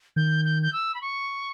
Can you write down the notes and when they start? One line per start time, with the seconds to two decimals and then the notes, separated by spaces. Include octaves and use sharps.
0.16 D#3 G6
0.45 G6
0.63 G6
0.73 E6
0.95 B5
1.01 C#6